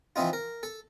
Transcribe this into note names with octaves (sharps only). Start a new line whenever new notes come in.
E3 F3 C4 D#4 F4
A#4
A4